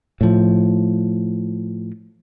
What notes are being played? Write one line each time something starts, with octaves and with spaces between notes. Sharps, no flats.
A2 F3